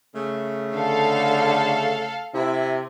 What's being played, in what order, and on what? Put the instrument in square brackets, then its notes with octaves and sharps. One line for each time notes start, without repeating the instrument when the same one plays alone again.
[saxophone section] C#3 A3
[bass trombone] D3 [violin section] A4 F5
[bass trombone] C3 [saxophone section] E4